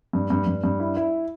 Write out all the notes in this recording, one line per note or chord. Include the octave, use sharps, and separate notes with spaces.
G2
G2
G2
G2
E4
E4